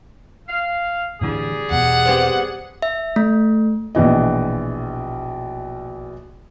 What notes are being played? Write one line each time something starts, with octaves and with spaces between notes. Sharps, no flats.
F5
A2 D3 E3 G3 G#4
E2 B2 F#5
B3 C4 G4
E5
A3
A#1 B2 E3 D#5